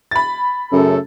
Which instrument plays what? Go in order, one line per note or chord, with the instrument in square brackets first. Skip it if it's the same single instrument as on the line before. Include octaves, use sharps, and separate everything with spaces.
[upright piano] B5 A6
[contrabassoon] F#2 [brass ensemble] C#3 A3 A4